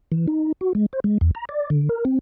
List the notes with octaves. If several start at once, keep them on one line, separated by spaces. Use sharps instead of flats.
E3
D#4
F#4
G#3
C5
G#3
E2
A#5
D5
D3
A#4
C4